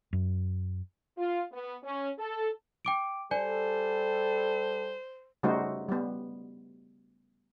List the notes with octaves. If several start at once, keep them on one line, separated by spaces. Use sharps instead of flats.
F#2
F4
B3
C#4
A4
G5 D6 D7
G3 A4 C5 D5 G#5
C#3 G3 A3 D#4 F#4 C5
G3 B3